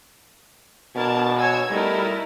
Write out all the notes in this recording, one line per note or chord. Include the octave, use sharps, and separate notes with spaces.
B2 D4 A#4 A5 G#6
C#5 G#5 E6 G#6
G3 A3 D#4 E4 A#4